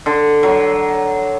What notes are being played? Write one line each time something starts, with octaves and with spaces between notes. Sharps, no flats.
D3
F#3